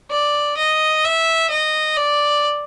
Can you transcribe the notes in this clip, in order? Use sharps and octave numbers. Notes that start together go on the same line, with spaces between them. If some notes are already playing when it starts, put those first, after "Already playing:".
D5
D#5
E5
D#5
D5